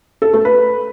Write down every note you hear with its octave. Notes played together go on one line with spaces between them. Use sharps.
A4
A3
B4